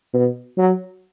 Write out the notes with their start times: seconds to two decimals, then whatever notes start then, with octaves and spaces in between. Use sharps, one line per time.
0.13 B2
0.57 F#3